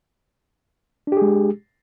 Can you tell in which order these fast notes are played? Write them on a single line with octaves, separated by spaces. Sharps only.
D4 G4 G#4 G#3